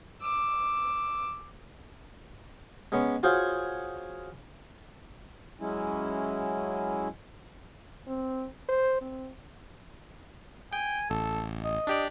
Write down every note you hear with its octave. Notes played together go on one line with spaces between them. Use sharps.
D6 E6
G#3 B3 C#4
F4 F#4 G#4 C5 C#5 F5
F#3 G#3 C#4 E4
C4
C5
C4
G5 G#5
A1 A4
D#5
D4 G4 D5